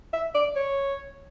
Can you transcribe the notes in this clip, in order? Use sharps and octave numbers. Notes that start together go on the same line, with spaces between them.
E5
D5
C#5